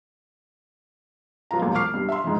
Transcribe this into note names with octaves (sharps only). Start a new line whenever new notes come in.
F#3 B3 F4 A#5
E1 A#1
C#6 D6 F6 C7
G2
E5 C6
F2 G#2